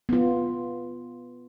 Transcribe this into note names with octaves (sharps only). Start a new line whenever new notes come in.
B3 F4